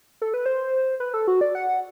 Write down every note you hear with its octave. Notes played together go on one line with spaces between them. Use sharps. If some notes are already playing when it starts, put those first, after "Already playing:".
A4
B4
C5
B4
A4
F#4
D5
F#5